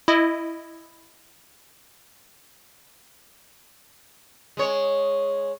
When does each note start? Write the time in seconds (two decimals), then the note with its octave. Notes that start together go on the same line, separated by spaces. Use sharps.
0.08 E4 D#5
4.57 G#3 C#5